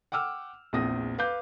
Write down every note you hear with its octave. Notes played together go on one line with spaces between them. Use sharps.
F#5 G5 D6 E6 F6
A#1 E2 C4 D#6 A#6
B4 F5 D6 G6